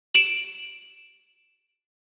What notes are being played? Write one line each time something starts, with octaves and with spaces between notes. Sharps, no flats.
D7 E7 F#7